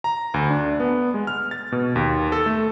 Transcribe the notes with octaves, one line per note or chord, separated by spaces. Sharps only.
A#5
D2
D4
B3
G#3
F6
A6
B2
D#2
A4
A3